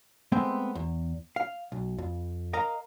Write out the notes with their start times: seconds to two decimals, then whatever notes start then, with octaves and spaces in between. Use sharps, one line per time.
0.32 G#3 A3 B3 C4 E5 G5
0.75 E2
1.36 F5
1.72 B1
1.98 F2
2.53 A#4 D#5 F5 A#5